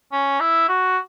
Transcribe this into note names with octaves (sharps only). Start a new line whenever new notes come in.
C#4
E4
F#4